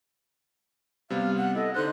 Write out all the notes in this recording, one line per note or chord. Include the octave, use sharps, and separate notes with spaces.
C3 G3 B3 F5
F#5
E4 A4 D#5
D3 D#4 A4 C5 F#6